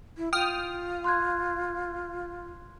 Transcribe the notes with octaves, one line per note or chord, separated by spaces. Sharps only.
E4
F4 G5 D#6 F6
C6 F#6 G#6